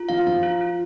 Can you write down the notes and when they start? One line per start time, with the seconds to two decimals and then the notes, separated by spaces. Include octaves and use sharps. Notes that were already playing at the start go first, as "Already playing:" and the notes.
Already playing: F4
0.09 F3 F5
0.27 F3 F5
0.43 F4
0.61 F4